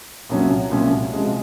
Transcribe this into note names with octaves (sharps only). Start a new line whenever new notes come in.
C2 A#2 F#3 C#4
C2 A#2 F#3 C#4
C3 F3 G#3